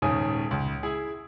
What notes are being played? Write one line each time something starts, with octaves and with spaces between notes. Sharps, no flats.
D#1 G#2 C#3 G#5 D#6
C#2
E4 G#4